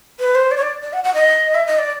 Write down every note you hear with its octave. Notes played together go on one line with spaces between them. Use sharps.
B4
C5
D5
C#5
D5
D5
F#5
F#5
D#5
E5
D#5
D5